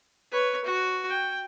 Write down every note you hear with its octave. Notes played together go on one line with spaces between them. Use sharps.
B4 C#5
F#4
G5